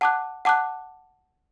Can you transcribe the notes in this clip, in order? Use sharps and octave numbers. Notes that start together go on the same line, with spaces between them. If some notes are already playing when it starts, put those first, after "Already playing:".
F#5 A5 D6 F#6
F#5 A5 D6 F#6